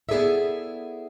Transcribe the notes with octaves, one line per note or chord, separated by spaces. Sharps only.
B3 E4 G#4 A4 D5 E5